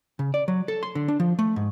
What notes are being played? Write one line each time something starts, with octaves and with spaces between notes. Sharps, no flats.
C#3
D5
F#3
A4
C6
D3
D4
F3
A3
G#2